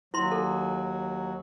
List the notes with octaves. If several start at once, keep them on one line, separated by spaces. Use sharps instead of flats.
D#2 F#3 E4 C6
A4